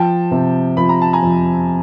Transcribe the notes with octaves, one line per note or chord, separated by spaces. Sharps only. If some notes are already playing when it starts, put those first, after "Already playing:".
Already playing: F3 G5 A5
C3
F3 B5
A#5
A5
G#5 A#5
F2